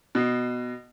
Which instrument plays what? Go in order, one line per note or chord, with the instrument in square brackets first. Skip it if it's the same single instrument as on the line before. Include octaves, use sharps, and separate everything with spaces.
[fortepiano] B2